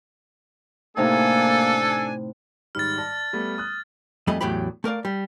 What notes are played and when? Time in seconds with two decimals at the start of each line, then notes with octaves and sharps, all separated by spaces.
0.97 A2 C3 A#3 D4 D#4 A4 G#5
2.75 G#2 D#3 G3 F6 A6
2.98 D5 A5 A#6
3.33 G3 A3 B3
3.58 D#6 F#6
4.27 F2 G3 A3 G#4 D#5 B5
4.41 E2 A2 F#3 G4 B5
4.84 A3 A#4 D5 F5
5.05 G3